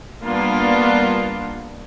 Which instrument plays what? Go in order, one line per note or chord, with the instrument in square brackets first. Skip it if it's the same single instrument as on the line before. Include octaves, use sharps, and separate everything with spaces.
[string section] G3 A#3 B3 D4 F4